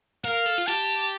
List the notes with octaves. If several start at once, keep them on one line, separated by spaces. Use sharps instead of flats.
A#4 F5
A4
F4
G4 A5